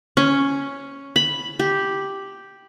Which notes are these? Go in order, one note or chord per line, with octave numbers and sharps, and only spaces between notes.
C#4
B5
G4